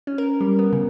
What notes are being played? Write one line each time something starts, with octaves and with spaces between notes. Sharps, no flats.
C#4
A#4
G3
B3
C#3